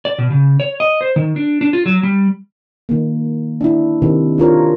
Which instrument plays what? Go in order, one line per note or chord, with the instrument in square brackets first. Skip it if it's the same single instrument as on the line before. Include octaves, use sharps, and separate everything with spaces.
[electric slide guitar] D5
B2
C#3
C#5
D#5
C5
D#3
D4
D4
F4
F#3
G3
[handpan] D#3 A#3
D4 E4
C3 D#3
D4 F4 A#4 C#5